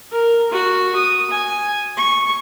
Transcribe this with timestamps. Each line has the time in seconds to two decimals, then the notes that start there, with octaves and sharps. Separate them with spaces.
0.12 A#4
0.51 F#4
0.96 D#6
1.31 G#5
1.97 C#6